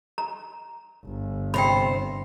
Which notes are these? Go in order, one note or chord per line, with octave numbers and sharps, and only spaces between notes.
A#5
G1
C3 C5 G5 B5